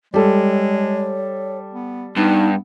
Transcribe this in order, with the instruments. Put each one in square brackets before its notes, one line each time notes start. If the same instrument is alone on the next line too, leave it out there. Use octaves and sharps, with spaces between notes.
[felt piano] G3 A4 [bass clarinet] G#3 [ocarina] C#5
[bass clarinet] B3
[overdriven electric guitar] G2 [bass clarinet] B3 [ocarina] D#4